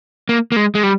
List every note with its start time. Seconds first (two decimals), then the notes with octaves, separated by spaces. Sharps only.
0.29 A#3
0.52 A#3
0.56 G#3
0.75 G#3
0.83 G3